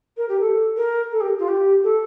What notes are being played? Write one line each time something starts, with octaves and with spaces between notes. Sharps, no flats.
A#4
G4
A4
A#4
A4
G4
F4
G4
A4